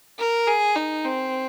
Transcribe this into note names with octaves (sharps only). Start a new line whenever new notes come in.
A#4
G#4
D#4
C4